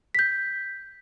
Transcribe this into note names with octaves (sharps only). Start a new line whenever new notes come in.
G6 B6